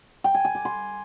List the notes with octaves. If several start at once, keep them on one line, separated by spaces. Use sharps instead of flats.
G5
G#5
G#5
D6
C6